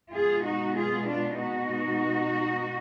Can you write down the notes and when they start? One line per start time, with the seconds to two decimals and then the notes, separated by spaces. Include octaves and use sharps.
0.12 B2 G#3 B3 F4 G#4
0.43 D#4 F#4
0.75 F4 G#4
1.07 D4 F4
1.38 D#4 F#4